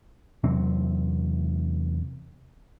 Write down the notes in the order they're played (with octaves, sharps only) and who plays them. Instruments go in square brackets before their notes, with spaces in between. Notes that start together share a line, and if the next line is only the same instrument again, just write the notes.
[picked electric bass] E2 C3 F#3 C4